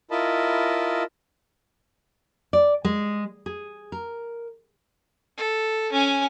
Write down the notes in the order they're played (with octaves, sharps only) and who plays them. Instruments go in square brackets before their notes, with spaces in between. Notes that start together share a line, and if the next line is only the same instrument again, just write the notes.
[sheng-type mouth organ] E4 F4 A#4 D#5 A5 B5
[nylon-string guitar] D5
G#3
G#4
A#4
[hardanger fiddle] A4
C#4 G#5